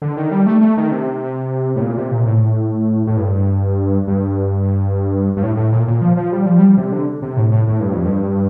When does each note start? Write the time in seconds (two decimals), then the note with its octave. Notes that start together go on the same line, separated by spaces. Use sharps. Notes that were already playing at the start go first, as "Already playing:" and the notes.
0.02 D3
0.17 D#3
0.31 G3
0.46 A3
0.61 A3
0.77 D#3
0.91 C3
1.76 A2
1.82 A#2
1.97 C3
2.11 A#2
2.26 A2
3.07 A2
3.17 G2
4.08 G2
5.37 G2
5.43 A2
5.57 A2
5.72 A#2
5.88 A#2
6.01 F3
6.17 F3
6.32 G3
6.46 F3
6.59 G3
6.77 C3
6.92 D3
7.22 C3
7.37 A2
7.52 A2
7.67 A2
7.80 G2
7.92 F2
8.05 G2